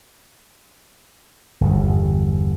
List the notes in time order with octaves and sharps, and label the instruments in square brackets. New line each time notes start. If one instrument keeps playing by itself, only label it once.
[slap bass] G1 E2